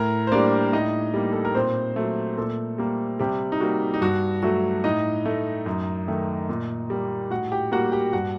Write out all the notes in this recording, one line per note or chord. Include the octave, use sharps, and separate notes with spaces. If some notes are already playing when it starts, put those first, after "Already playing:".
Already playing: A2 A#4 A#5
C5
G3 A#3 D4 D5
A2 D#4 D#5
G3 A#3
A4
A#4
A#2 C4 C5
F#3 A3
A#2 A3 A4
G3 A#3
C3 G3 G4
D#4
G3 A#3 F#4
D#4
G2 F#4
F#3 A3 F#4
A2 D#4 D#5
A3
F#2
D#3 A3
A#2
G3 A#3
A2 F#4 F#5
G4 G5
G3 A#3 F#4 F#5
G4 G5
G2 F#4 F#5